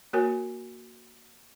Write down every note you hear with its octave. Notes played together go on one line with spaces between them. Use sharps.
A#3 F#4 A#4 C#5 G#5